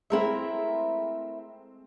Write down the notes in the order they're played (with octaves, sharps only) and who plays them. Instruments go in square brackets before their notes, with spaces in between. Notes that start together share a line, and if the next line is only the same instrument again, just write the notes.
[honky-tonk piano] G#3 A3 C4 [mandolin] E4 A#4 E5